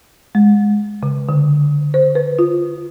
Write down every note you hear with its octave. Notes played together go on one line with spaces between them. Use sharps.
G#3
C#3
D3
C5
B4
F4